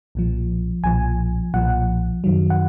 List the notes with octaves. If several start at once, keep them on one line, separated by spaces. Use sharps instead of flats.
B1 A#2 F3
B1 A#2 F3 G#5
B1 A#2 F3 F#5
F#2 D#3 F#3
F#5